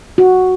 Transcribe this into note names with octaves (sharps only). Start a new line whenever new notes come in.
F#4